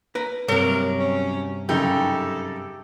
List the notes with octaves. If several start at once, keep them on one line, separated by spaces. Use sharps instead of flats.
B4 A#5
G2 C3 F#3 A#4
C#4
F#2 C#3 D#4 G4 A4